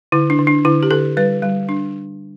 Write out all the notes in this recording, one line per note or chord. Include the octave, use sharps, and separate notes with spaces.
D3 E4
D4
D3
D4
D3 E4
G4
D3 A4
G3 B4
G3
D4